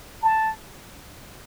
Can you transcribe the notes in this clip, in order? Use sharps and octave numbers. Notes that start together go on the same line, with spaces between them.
A5